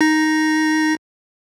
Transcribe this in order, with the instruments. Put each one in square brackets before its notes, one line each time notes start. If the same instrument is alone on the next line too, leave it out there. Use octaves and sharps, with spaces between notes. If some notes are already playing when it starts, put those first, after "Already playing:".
[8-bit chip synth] D#4 A#6